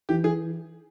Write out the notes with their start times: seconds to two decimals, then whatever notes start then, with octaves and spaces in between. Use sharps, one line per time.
0.09 E3 G4
0.23 E3 G#4